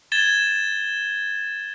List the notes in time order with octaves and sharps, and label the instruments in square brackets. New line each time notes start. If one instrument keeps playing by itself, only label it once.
[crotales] G#6 A6 E7 G7